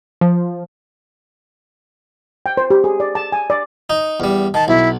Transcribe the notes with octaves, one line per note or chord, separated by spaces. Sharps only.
F3
G5
C5
G4
G#4
D5
A5
G#5
D5
D#4
E2 G3
D#3 A5
B1 E4